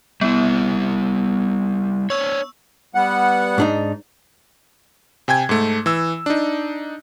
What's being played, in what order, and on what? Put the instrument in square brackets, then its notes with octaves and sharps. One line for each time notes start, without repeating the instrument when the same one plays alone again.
[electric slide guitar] G3 E4 [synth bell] B3
[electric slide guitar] D4 C#5 [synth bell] C#6 E6
[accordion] G3 B3 F#5
[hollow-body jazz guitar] G#2 D4 D#4
[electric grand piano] C3 G5 G#5 G#6
G#2 A3
E3 E6
D4 D#4